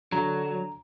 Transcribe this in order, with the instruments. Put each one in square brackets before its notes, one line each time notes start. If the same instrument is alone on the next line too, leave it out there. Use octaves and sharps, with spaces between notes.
[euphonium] D3 [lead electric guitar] F#3 [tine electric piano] A#5